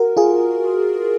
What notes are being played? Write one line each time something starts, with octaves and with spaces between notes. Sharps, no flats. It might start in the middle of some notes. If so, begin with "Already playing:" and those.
Already playing: F#4 A#4
F4 G#4